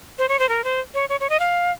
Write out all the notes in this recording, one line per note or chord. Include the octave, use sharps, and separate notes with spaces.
C5
C#5
C5
A#4
C5
C#5
C#5
C#5
D#5
F5